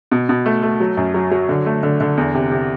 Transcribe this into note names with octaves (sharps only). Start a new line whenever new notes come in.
B2
B2
A3
A3
F#3
F#2
F#3
F#3
D3
A3
D3
D3
E2
C3
C3